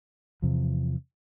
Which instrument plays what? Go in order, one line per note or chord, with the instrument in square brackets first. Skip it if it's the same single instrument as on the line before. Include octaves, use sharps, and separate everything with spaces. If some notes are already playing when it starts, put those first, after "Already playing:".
[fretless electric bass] E2 C3 F3